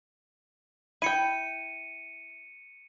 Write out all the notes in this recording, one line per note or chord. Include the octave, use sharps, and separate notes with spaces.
E4 G5 C#7 D#7